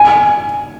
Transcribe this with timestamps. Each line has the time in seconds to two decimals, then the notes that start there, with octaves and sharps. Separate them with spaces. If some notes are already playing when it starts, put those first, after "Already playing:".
Already playing: G#5